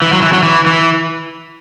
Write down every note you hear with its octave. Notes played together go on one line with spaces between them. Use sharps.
E3
F#3
E3
F#3
E3
E3